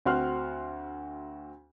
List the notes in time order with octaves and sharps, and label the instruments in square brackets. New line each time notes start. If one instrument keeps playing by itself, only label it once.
[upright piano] D2 C4 F#4 C6 F6 F#6